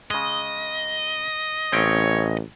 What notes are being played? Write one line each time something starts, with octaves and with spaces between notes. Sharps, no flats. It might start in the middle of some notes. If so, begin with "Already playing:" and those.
C#3 G#3 D#5
A1 C4 C#4 C#5 G5